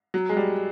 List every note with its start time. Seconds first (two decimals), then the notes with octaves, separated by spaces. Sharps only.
0.14 F#3
0.29 G#3
0.37 G3